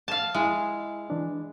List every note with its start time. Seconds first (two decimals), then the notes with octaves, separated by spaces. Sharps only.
0.08 F5 A5
0.34 G#3 E4 E5
1.10 E3 D4